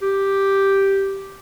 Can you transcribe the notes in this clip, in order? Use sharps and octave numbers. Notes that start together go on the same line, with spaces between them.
G4